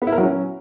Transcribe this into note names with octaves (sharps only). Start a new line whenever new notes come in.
B3
E4
A#4
F#3
C#4